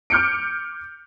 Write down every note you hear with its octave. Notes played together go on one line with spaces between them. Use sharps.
D6 F6 G6 C#7 D7